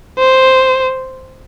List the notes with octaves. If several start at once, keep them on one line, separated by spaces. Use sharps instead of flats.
C5